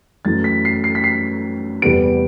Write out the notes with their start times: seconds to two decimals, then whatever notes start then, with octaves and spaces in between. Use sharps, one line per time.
0.25 F#2 E3 A3 A6
0.44 B6
0.65 C7
0.84 C7
0.95 B6
1.04 C7
1.82 E2 C3 G3 B3 D7